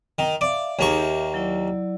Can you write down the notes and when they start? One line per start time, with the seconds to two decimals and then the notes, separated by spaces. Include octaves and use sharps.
0.19 D#3
0.41 D5 E5 F5
0.79 D#2 A#3 D#4 G#4 C#6
0.98 G4 E5
1.34 F#3 E4 D5